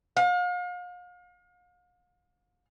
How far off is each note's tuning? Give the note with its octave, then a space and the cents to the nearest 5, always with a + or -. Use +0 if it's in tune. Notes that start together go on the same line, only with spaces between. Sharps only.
F5 +40